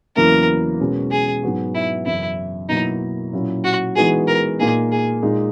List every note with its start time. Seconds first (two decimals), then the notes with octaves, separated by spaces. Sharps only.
0.16 E2 C#3 F#3 A#3 E4 A#4
0.80 B2 G#3 C#4
1.11 G#4
1.43 G#2 F#3 B3 F#4
1.74 E4
2.06 F#2 C#3 E3 E4
2.69 B2 F#3 A#3 D#4 E4
3.33 A#2 F#3 C#4 E4
3.65 F#4
3.96 E3 G#3 B3 D#4 F#4 G#4
4.28 A#4
4.59 A#2 A#3 D#4 G#4
4.92 G#4
5.22 A#2 G#3 D#4